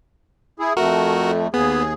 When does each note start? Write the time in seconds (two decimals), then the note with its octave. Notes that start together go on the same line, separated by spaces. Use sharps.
0.59 E4 G#4
0.77 F2 A3 F#4 A#4
1.54 D#2 B3 G#4